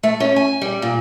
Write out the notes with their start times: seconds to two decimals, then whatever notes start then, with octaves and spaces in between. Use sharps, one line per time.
0.03 A3
0.20 C#4
0.36 G#5
0.62 G3
0.82 A#2